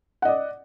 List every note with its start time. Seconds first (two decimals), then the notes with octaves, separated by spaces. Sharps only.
0.22 F#5
0.25 D#5
0.28 D5